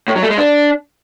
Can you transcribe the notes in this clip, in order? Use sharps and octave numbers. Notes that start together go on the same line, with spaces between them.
A2
F#3
A3
G#3
D4